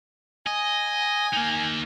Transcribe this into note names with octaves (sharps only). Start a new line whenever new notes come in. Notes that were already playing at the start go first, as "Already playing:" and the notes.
D#5 G#5
A#3 D#4